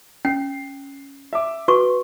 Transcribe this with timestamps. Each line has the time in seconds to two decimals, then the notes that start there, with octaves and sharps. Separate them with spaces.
0.25 C#4 C7
1.33 E5 D6
1.68 F#4 B4 C#6 D6